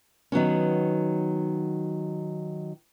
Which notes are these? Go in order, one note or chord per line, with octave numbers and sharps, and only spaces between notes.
D#3 F#3 B3 C#4